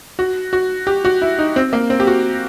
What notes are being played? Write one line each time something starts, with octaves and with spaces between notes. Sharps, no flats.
F#4
F#4
G4
F#4
E4
D#4
C4
A#3
C4
G4
F#4